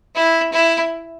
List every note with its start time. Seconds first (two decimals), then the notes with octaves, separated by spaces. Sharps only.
0.15 E4
0.53 E4